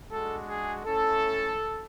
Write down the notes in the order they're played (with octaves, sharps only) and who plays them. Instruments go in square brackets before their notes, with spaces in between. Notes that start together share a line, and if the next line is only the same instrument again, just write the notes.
[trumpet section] G#3 D4 F#4 A4
G#4
A3 C#4 E4 A4